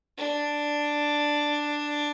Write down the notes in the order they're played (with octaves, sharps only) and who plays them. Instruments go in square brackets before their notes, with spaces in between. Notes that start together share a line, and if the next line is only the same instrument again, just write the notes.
[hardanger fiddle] D4